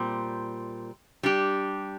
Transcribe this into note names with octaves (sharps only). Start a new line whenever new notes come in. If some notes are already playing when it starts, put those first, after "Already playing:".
Already playing: A#2 G3 C4
G3 D4 G4